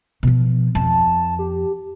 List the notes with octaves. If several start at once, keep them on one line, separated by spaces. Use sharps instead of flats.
B2 F3
F2 A5
G4